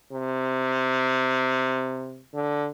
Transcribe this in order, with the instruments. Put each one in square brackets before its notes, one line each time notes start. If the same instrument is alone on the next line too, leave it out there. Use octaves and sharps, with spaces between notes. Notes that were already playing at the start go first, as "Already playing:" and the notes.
[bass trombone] C3
D3